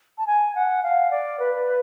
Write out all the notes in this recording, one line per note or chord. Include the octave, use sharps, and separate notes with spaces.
A5
G#5
F#5
F5
D5
B4